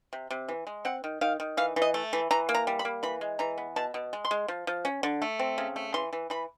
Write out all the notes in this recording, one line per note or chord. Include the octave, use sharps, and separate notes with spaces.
C3
C3
E3
G#3
C4 F#5
D#3
D#3 F5
D#3
E3 F5
E3
D#5
A3
E3
E3 A#5
A#3
A#5
G3
B5
A#3
E3 B5
G#3
E3 A#5
B3
B2 A5
B2
G#3
C6
G#3
F3
F3
C#4
D3
A3
C4
C#3
A3
E3 C6
E3
E3 B5